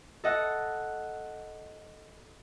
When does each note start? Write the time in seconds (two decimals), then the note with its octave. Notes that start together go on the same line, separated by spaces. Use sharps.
0.24 A4 D#5 F#5